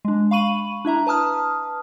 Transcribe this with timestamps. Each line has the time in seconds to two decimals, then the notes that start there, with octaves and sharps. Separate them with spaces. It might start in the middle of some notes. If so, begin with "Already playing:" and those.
0.05 G#3 D4
0.31 F5 B5 C#6 D#7 F#7
0.85 D4 E4 E5 A#5
1.07 B4 A5 D#6 F6